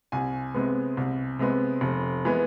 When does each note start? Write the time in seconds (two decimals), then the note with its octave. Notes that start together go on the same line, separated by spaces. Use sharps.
0.12 C2 G#5
0.54 C3 G#3 B3
0.97 C2
1.39 C3 G#3 B3
1.81 F1
2.25 E3 G#3 B3